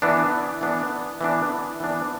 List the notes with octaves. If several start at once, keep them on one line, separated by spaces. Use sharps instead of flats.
E3 B3 D4
E3 B3 D4
E3 B3 D4
E3 B3 D4